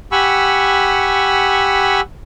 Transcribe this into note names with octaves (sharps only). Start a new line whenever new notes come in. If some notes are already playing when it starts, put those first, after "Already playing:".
G4 F#5 G#5 B5 C#6 E6